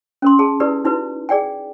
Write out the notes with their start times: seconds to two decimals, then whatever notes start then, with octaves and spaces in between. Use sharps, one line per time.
0.22 C#4 A#4 C6
0.39 G#4 A5
0.60 E4 G4 A#4 B4 D5
0.85 D#4 E4 F#4 B4
1.29 G#4 D5 G5 G#5